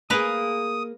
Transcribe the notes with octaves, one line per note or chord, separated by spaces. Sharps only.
A#3 G#4 A#4 B4 F5 D#6